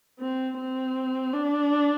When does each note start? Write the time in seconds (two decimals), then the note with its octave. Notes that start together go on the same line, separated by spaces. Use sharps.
0.19 C4
0.57 C4
1.33 D4